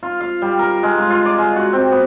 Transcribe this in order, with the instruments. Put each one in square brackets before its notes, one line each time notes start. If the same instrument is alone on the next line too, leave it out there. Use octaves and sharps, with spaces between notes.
[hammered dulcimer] F4
F5
G3
A#4
G#3
F4
F4
D5
G#3
F#4
C4
B3